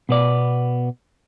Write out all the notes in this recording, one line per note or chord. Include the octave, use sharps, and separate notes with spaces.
B2 B3 D5